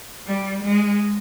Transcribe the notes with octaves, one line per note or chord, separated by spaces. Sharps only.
G3
G#3